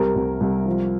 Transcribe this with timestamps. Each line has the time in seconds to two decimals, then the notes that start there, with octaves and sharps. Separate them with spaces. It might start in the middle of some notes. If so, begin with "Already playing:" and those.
Already playing: C2 G4 A#4
0.16 C2
0.41 C2
0.66 F3